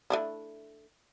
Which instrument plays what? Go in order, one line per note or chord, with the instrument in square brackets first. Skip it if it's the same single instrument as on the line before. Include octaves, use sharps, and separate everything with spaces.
[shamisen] A3 D4 E4